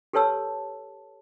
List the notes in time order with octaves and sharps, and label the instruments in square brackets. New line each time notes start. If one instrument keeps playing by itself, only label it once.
[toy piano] G4 A4 B4 C#5 A5 E6